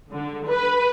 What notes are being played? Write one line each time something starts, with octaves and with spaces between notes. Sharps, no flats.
D3
B4